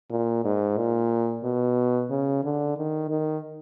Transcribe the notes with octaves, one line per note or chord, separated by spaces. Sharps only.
A#2
G#2
A#2
B2
C#3
D3
D#3
D#3